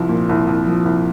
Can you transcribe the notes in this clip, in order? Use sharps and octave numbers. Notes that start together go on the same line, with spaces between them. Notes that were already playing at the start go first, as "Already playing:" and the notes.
Already playing: C2 F3
A#2
C2
C2
F3
C2